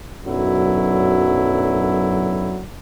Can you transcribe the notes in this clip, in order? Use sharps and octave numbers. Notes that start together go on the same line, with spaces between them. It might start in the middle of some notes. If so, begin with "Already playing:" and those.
B1 F#2 D3 F#3 E4